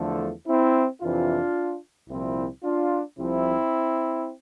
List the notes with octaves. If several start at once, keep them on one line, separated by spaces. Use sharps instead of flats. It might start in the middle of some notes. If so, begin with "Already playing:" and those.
Already playing: E2 D3 F3 A3
C4 E4
F2 C3 E3 D4 F4
C2 A#2 F3 C4 E4
D4 F4
C2 C3 F3 C4 E4